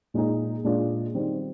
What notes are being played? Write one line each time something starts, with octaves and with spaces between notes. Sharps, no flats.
A#2 G#3 D#4 G#4
A#2 G#3 D4 F4 G#4
D#3 G3 C4